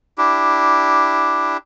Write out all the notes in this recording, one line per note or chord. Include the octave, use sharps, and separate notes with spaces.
D4 E4 G4